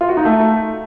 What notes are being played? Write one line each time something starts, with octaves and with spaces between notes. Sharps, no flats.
F4
F#4
D#4
A3